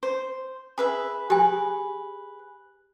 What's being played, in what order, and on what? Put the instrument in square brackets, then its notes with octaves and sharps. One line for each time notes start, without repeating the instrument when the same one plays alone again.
[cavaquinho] C5
G#4 B4 E5
[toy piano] G4 G#5 [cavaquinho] G#4 B4